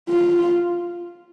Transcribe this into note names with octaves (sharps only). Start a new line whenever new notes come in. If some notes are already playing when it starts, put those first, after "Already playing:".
F4